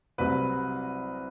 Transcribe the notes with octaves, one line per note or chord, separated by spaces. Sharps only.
C2 C3 F#3 B4